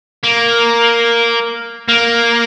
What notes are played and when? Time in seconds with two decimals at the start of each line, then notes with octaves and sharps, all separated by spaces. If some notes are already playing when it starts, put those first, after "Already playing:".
0.23 A#3
1.89 A#3